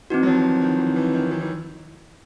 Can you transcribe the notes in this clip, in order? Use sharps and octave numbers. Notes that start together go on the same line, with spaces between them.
E3 C4 D#4 F#4
F#3
D#3 F3
D#3
E3
E3
D#3
E3
E3